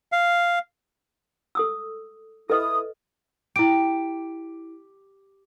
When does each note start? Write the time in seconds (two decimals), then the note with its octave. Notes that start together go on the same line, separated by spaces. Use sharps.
0.12 F5
1.55 A4 D#6 E6
2.50 E4 A4 B4 D#5 D#6
3.56 E4 G4 D7